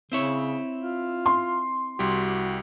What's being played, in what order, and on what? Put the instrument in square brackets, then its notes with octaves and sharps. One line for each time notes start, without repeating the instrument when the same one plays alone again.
[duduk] C#3 [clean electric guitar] C4 E4 C#5
[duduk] F4
[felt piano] C6
[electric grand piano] C2 G3 G4 [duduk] F#4